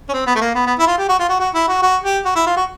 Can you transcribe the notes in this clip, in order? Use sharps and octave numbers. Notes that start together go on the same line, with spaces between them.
C#4
C4
B3
A3
A#3
B3
B3
E4
F4
G4
F#4
F4
F#4
F#4
E4
F#4
F#4
G4
F#4
E4
F4
F#4